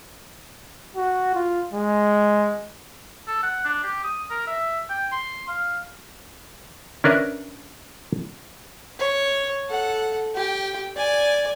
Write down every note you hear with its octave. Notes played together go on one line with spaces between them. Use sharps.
F#4
F4
G#3
A4
F#5
D4
G4
D#6
A#4
E5
G5
C6
F5
C#4 D4 A#4 B4 E5
C#5
A4 F#5
G4 G5
D5 G#5